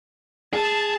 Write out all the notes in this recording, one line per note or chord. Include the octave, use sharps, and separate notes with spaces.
G#4 A5